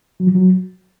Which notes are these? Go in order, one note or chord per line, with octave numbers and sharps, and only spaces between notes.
F#3
F3
F#3